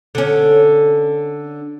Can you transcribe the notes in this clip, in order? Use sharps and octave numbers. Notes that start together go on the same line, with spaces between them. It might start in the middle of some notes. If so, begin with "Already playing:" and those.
D3 C#4